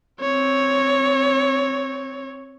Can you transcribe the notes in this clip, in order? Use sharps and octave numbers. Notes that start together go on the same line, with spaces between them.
C4 C#5